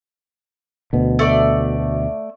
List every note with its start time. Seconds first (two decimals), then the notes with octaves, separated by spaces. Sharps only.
0.93 D2 B2
1.19 A3 D5